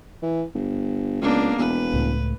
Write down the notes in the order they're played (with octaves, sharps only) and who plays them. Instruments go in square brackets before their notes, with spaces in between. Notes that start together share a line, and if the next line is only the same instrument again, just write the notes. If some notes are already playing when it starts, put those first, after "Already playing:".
[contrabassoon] E3
G1
[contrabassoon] C#2 [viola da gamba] A#3 B3 D4
[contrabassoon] E1 [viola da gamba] B4
[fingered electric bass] C#2 A2